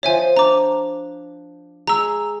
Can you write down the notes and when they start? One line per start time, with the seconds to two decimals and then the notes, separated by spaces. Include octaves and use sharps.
0.03 F3 C5 C#5 E5 G#5 A5
0.37 D4 A#5 D6
1.87 G#3 A#5 E6